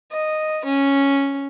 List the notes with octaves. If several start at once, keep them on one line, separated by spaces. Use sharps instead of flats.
D#5
C#4